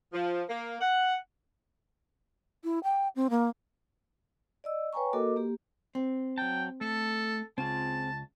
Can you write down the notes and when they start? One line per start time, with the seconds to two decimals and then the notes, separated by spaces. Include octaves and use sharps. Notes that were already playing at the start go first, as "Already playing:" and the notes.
0.13 F3
0.49 A#3
0.81 F#5
2.64 E4
2.84 G5
3.16 C4
3.30 A#3
4.64 D5 D#5 E6
4.93 B4 C#5 G5 G#5 A#5 C#6
5.13 A#3 F#4 A4 A#4 D#5 D6
5.36 A#3 G4
5.95 C4
6.38 F#3 G5 A5
6.81 A3 A4
7.58 C#2 C4 F4 G#4 A5